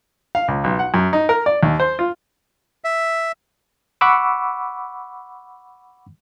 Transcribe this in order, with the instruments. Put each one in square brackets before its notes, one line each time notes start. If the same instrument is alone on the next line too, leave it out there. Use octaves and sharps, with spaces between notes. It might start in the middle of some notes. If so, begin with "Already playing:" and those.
[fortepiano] F5
C#2
B1
F#5
F#2
D#4
A#4
D5
D#2
C5
F4
[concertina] E5
[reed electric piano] F#5 B5 C#6 D6 E6